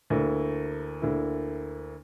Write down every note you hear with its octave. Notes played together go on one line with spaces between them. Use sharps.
D2 D3 A#3 E4
D2 D3 A#3 E4